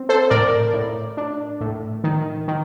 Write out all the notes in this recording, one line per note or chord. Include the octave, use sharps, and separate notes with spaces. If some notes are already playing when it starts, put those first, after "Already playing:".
Already playing: C4
A4 C5
A2 A#4 D5
A2
D4
A2
D#3
D#3